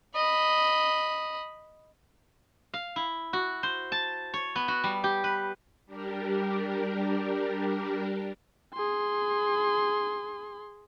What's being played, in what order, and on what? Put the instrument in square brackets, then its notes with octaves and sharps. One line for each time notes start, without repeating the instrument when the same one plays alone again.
[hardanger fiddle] D#5 B5
[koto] F5
E4
F#4
C5
A5
C#5
B3
F#4
G3
G4
B4
[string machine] G3 D4 G4 A#4
[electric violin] G#4 C6